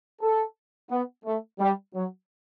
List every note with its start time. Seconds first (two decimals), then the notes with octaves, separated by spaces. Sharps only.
0.21 A4
0.90 B3
1.25 A3
1.59 G3
1.94 F#3